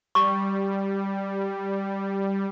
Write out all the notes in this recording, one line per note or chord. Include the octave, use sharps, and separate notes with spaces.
G3 C#6